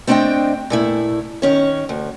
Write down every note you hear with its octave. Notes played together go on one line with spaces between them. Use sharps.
A3 C4 D4 B4 D#5 G5
A#2 A3 E4
D#3 C#4 C#5
D2